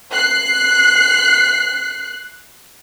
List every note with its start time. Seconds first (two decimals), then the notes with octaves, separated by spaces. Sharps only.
0.12 F#6 C7